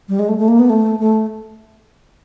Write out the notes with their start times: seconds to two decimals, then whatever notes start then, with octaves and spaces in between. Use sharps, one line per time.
0.09 G3
0.19 G#3
0.29 A3
0.39 A3
0.48 A#3
0.59 B3
0.70 A3
0.99 A3